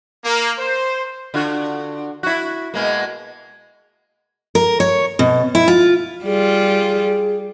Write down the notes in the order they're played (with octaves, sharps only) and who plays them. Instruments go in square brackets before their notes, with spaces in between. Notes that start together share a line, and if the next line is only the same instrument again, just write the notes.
[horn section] A#3
C5
[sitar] D3 F4 F#4
E4 F#4
B2 G#3 A#3
[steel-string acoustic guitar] A#4
C#5
B2
E4
F4
[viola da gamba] G3 F4 [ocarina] G#4